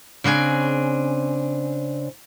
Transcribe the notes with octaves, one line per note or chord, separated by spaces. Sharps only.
C#3 C4 D4 G#5